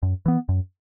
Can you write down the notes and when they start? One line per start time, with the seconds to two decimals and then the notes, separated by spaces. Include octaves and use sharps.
0.03 F#2
0.26 E3 B3
0.49 F#2